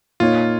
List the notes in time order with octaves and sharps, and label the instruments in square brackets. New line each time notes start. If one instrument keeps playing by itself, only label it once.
[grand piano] A#2 A#3 D#4 C#5 [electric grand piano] F4